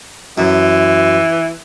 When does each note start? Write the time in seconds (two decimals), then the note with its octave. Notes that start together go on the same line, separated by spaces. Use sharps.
0.38 F#2 E3